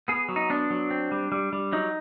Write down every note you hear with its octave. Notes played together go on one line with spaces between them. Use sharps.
B3 G#4
F#3
D#4
B3 D4
F#3
C4
G3
G3
G3
F#3 D#4